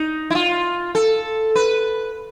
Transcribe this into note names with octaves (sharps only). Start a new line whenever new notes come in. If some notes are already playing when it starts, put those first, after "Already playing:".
Already playing: D#4
E4
F4
A4
B4